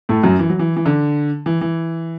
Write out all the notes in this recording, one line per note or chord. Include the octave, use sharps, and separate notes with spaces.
A2 A3
F#2 F#3
E3
F#3
E3
E3
D3
E3
E3